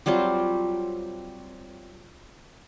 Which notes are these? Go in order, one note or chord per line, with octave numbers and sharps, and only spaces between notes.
F#3 G3 C4 F4